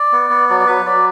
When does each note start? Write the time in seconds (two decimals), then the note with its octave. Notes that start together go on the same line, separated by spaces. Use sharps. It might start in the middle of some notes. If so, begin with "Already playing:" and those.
Already playing: D5
0.12 B3
0.30 B3
0.49 F#3 D5
0.60 D5
0.67 F#3 B4
0.86 F#3 D5